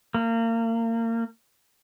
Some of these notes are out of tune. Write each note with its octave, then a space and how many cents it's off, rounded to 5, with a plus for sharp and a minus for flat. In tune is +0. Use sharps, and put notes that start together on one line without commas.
A#3 -30